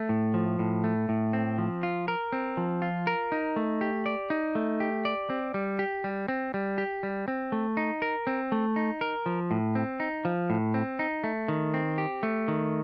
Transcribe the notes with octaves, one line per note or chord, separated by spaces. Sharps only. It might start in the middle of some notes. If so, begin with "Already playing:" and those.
Already playing: A3
A2
F3
A2
A3
A2
C4
F3
F4
A#4
C4
F3
F4
A#4
D#4
A3
G4
D5
D#4
A3
G4
D5
C4
G3
G4
G3
C4
G3
G4
G3
C4
A3
D#4
A#4
C4
A3
D#4
A#4
F3
A2
C4
D#4
F3
A2
C4
D#4
A3
D#3
C4
G4
A3
D#3